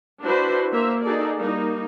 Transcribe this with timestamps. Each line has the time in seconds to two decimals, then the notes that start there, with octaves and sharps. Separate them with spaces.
0.23 D4 E4 F#4 B4 C5
0.72 A#3 C5 E5
1.02 D#4 F#4 G#4 A4 D5
1.36 G3 A#3 D#4